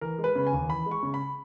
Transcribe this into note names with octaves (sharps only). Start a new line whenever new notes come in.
E3 A#4
G#3
B4
C#3
G#5
D#2
E3 B5
G#3
C#6
C#3
B5